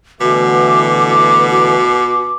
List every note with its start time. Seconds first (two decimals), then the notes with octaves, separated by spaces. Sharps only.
0.21 B2 D3 E3 A3 F#4 D6
1.49 F#4